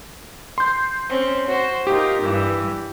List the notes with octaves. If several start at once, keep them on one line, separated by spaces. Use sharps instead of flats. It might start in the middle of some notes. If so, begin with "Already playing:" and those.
C6 G6
C4 C#4
F#4 C5
D#4 F4 G4 A#4
G2 E3